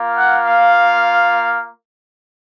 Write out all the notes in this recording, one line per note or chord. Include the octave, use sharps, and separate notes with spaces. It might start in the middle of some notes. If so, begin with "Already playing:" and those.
Already playing: A#3 F4
F#5
F5